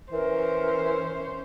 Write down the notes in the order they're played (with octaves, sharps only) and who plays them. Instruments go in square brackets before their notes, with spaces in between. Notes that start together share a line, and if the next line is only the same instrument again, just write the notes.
[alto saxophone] E3 [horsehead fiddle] C#4 C5 [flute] A#4